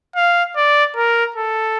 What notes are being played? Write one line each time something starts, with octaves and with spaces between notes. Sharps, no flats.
F5
D5
A#4
A4